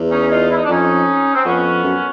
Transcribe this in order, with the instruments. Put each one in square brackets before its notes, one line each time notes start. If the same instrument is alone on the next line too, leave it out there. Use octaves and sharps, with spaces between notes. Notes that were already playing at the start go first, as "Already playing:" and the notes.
Already playing: [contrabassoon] E2
[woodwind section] C#4 D#4
D#4 F4
E4
D#4
D4
[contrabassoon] F2 [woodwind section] C#4 D#4
[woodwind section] C4
[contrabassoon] F2 [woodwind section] B3 C#4
[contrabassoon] F#2